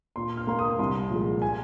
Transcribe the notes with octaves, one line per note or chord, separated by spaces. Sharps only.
A#2 C6
F6
A#3 C6
D#6
C2 C6
A#2 F3 G#3
G#5